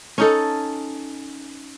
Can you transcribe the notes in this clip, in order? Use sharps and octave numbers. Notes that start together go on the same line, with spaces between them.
C#4 D#4 A4